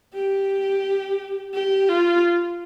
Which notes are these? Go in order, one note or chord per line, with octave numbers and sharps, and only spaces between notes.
G4
G4
F4